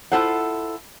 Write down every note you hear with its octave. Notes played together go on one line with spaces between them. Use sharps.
E4 F4 A4 C5 F#5